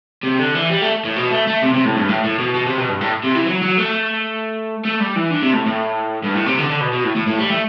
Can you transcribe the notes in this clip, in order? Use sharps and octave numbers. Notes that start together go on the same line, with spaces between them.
C3
D3
E3
G3
A3
A2
B2
A3
A3
C3
C3
A2
G2
A2
A2
B2
B2
C3
B2
G2
A2
C3
E3
F#3
F#3
A3
A3
G3
E3
D3
C3
A2
A2
G2
A2
C3
D3
D3
B2
B2
A2
A2
A2
G3
A3